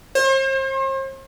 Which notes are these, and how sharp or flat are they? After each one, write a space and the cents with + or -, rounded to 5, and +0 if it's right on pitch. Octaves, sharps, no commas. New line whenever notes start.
C5 +40